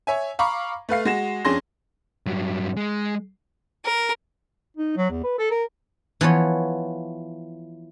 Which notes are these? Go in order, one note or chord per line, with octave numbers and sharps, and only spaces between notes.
C#5 E5 G#5
F5 A#5 B5 C#6 D6
A3 B4 F5 C7
G#3 F#4 A#6 E7
F2 C#4 D4 G#4 C6 A#6
G2 F#3
G#3
A#4
D#4
F#3
E2
B4
A4
A#4
E3 F3 B3 C#5